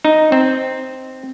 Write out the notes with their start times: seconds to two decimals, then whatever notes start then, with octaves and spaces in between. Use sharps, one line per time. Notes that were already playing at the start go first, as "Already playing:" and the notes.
0.05 D#4
0.32 C4